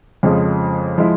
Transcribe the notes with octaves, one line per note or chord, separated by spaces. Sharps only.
F2 C#3 F3 G#3
F3 G#3 E4